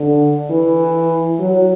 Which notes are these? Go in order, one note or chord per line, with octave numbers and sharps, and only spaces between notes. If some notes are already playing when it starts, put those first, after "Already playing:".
Already playing: D3
E3
F#3